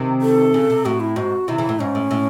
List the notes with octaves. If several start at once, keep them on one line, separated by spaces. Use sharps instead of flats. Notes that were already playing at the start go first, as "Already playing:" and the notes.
Already playing: C3 D#3
A4
C#3
C3
A2 F#4
E4
G#2 F#4
C3 D#3 E4
C#3 E3
A2
G#2 C#4
A2
A2